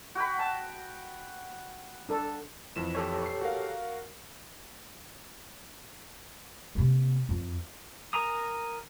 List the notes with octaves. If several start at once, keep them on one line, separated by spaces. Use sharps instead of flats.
F#4 G5 B5
A5
D4 A4
F2 E3 E7
G4 A4 C#5
C#6 C7
F#4 A#4 F5
C3 A#3
F2
A#4 G#5 A#5 D#6